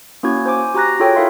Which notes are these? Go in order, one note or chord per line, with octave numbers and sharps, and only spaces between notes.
A#3 C#4 E4 F#4 G#6
C5 G#5 D6
F#4 G4 A#5 F#6 A#6
F4 F#4 G#4 A4 C#5 G5
E4 A#4 E5 F5 C6